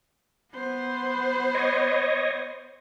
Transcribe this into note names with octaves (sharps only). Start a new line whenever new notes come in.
B3 C5
C#5 D#5